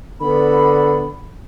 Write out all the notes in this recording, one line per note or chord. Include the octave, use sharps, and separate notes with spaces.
D3 B3 B5